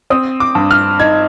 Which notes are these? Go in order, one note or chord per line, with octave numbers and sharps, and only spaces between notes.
C4 D#6
D6
G2
F6
D#4 G#6